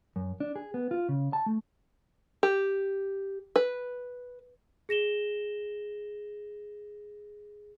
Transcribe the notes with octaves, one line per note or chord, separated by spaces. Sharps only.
F#2
D4
G#4
B3
F4
C#3
A5
A3
G4
B4
G#4 A#6 E7 G7